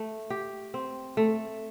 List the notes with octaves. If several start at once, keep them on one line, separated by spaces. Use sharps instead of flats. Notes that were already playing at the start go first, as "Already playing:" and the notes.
Already playing: A3
G4
C4
A3